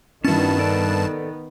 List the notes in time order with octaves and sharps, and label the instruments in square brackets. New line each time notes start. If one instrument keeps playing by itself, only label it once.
[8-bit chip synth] G2 A5 [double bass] D#3 B3 [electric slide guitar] C#4 E4 F#4
[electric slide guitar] A4 D5